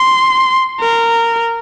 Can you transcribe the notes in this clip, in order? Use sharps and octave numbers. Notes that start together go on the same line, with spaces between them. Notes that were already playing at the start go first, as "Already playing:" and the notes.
Already playing: C6
A#4